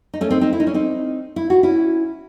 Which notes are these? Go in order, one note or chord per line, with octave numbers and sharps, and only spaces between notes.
D#4
A3 C#4
C4 D#4
C4 D#4
E4
D#4
C#4
C4 D#4
E4
F#4
C#4 E4